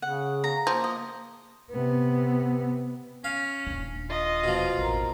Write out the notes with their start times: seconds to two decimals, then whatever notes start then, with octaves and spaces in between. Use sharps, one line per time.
0.02 C#3 F#5
0.44 A#5
0.67 F3 A#3
0.84 D#5
1.70 C3 B3
3.24 C#4 F5
3.67 D#1 D4
4.10 F4 D#5
4.44 B2 F3
4.78 A1 F2 A#4